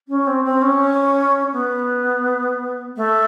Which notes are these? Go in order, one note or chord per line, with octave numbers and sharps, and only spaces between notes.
C#4
C4
C4
C#4
B3
A3